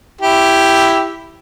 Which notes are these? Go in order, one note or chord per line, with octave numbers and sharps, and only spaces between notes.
E4 G4